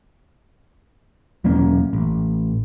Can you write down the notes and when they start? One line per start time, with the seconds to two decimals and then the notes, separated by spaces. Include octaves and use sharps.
1.44 E1 F#3 A#3 C#4
1.93 A1